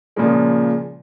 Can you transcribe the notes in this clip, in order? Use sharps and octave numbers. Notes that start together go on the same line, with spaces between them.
A#2 C#3 F3 G#3